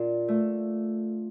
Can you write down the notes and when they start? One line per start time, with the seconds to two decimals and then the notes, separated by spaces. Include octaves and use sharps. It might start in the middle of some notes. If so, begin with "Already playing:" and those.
Already playing: A#2 D4 F4
0.28 A3